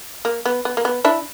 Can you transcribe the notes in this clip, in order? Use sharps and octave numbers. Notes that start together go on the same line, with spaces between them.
A#3
B3
B3
A#3
B3
D4 E4